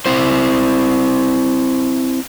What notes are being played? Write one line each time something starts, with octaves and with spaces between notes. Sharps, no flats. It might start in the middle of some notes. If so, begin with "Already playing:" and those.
C4 E4 C5